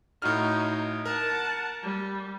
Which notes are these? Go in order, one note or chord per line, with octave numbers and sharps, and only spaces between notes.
A2 D#4 F#4 F6
A#4 F#5 A5
G3